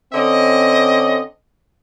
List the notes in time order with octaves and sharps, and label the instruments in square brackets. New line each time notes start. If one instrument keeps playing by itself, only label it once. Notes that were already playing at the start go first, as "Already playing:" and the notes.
[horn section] D3 C4 C#4 D#5